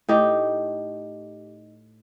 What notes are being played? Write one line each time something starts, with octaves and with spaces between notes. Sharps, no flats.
A2 D#4 G4